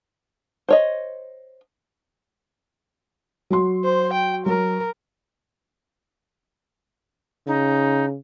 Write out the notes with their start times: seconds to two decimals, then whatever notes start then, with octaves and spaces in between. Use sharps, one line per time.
0.69 C5 C#5 D#5
3.50 F#3 F#4 C6
3.84 C5
4.13 G5
4.46 F#3 A#4
7.47 C#3 D#4